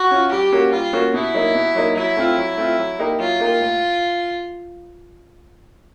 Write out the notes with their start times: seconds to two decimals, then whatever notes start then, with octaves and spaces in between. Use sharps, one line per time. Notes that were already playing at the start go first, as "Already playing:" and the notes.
Already playing: F#4
0.11 C#4 F4
0.32 G3 G4
0.52 A#3 C#4 F#4
0.72 G3 F4
0.93 A#3 C#4 F#4
1.14 B2 E4
1.34 F#3 A#3 D#4
1.55 B2
1.75 F#3 A#3 D#4
1.96 F#3 E4
2.17 A3 C4 F4
2.37 F#3
2.58 A3 C4 F4
2.78 F#3
2.99 A#3 D#4 G4 A#4
3.19 F#3 F4
3.40 A#3 D#4 G4 A#4
3.60 A2